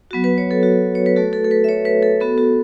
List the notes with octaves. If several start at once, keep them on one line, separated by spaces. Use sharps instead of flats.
F#3 B3 F#4
B4
C#5
A4
F#4
C#5
B4
A3 F#4 A4
A4
A4
B4
E5
C#5
B4
A4
B3 F#4 A4
F#4